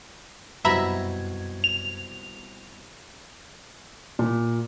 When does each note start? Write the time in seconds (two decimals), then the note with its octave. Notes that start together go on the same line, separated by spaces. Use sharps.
0.65 C2 F#2 B2 E5 F#5 A#5 B5 G#6
1.64 F7
4.19 A#2